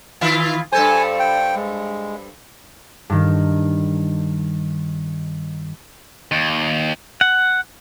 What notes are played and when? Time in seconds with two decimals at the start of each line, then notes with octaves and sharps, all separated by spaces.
0.21 D#3 E4 F4
0.72 G2 A4 C5 G#5
1.19 G5
1.56 G#3
3.10 G2 D#3
6.32 D#2
7.21 F#5